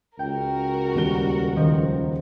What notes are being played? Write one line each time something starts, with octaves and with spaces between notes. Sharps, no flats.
C#2 F#4 A#4 G5
D#1 G3 G7
D#3 F3